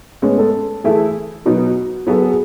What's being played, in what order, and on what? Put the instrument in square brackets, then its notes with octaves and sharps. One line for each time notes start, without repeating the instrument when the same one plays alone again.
[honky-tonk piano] A2 G#3 B3 [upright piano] C#4
[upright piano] A4
[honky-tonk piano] E3 A3 E4 A4 [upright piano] G#4
[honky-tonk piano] B2 F#3 B3 D#4 [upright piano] F#4
[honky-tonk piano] F#3 B3 F#4 A4 [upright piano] G#4
[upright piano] G#4